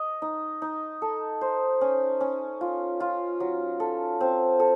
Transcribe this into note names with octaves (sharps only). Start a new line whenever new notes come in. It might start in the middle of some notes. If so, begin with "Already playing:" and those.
Already playing: D#5
D#4
D#4
A4
C5
C#4
C#4
F4
F4
F#3
A4
C4
A4